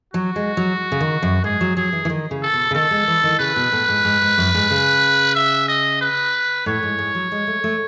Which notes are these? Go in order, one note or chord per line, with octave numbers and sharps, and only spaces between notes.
F#3 F#4
G#3
F#3
C#3
D#3
F#2
G#2 G#4
F#3
F#3 G#4
E3
E3
D#3
C#3
A4
B2
C#3
D#3 A4
G#3
E3
D#3
C#3 B4
B2
A2
G#2
G#2
G#2
F#2
G#2
C#3
E5
D#5
B4
A2 C#5
G#2
G#2
F#3
G#3
A3
A3